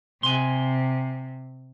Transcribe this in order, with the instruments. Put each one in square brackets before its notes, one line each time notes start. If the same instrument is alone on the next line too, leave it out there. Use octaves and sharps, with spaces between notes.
[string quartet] C3 [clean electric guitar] G#5 C6